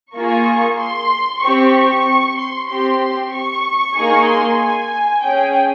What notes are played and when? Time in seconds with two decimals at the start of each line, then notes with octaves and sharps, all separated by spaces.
0.15 A#3 F4 G#4 C#6
0.79 C6
1.41 C4 G4 C#6
1.73 C#6
2.37 C6
2.69 C4 G4 C6
3.01 C6
3.32 C#6
3.96 A#3 D#4 G#4
4.27 C6
4.60 G#5
5.23 C#4 G#4 G5